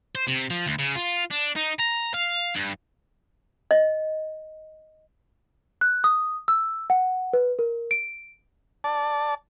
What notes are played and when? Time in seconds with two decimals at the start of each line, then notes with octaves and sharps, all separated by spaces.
0.15 C5
0.28 C3
0.50 F3
0.67 D2
0.79 C#3
0.96 F4
1.31 D4
1.56 D#4
1.80 A#5
2.14 F5
2.55 G2
3.71 D#5
5.81 F#6
6.04 D#6
6.48 E6
6.90 F#5
7.33 B4
7.59 A#4
7.91 D7
8.84 D5 A5